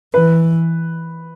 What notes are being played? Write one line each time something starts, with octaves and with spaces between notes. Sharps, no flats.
E3 B4